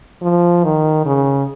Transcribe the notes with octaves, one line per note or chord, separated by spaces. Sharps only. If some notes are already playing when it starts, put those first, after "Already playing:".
F3
D#3
C#3